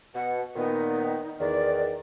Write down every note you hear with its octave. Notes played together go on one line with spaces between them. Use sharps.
B2 F#5
A#2 D#3 B3 D#4
E2 D#3 D5